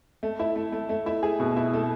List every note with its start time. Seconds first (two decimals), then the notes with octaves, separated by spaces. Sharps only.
0.23 A3
0.39 E4
0.56 A3
0.72 A3
0.89 A3
1.06 E4
1.23 G#4
1.40 B2
1.56 E4
1.74 A3